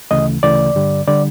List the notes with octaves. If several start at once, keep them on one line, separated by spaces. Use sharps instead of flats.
D2 C#3 E3 A3 D#5
D2 C#3 E3 A3 D5
G2 D3 G3
D3 G3 D5